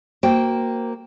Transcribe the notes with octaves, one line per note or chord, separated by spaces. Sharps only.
A#3 F#4 C5 G5